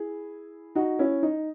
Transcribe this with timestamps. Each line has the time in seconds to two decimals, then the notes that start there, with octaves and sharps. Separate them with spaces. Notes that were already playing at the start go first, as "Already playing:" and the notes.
Already playing: E4 G#4
0.75 D#4 F#4
0.99 C#4 E4
1.23 D#4